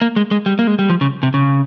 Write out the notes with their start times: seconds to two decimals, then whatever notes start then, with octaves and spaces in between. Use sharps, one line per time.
0.01 A#3
0.16 G#3
0.31 G#3
0.46 G3
0.59 A#3
0.67 G#3
0.79 G3
0.90 F3
1.01 C#3
1.23 C3
1.34 C#3